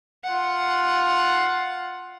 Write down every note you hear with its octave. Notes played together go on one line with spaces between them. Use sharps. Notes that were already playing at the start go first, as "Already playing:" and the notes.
F4 F#5